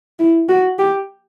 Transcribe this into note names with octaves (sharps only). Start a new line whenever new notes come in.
E4
F#4
G4